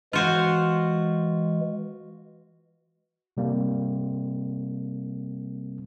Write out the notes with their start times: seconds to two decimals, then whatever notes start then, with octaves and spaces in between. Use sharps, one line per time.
0.13 E3 G#3 F4 F#4 C5
3.37 C3 G3 A#3 C4